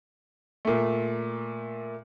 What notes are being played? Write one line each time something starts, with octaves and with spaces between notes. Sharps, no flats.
A#2 A3